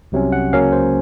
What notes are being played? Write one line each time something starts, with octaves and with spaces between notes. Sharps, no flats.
C2 C3 F#3 C#4
F#5
C#2 C#3 F#3 A#3 C#4 F5
C5